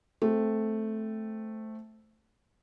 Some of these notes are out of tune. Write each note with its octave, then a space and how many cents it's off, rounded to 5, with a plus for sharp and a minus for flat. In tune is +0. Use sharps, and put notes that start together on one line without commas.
A3 -5 C4 +0